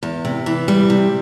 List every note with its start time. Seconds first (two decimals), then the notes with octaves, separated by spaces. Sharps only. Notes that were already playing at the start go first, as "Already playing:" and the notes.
0.03 E2
0.25 C3
0.46 E3
0.68 G3
0.90 C3